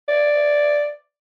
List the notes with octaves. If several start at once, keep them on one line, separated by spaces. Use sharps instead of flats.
D5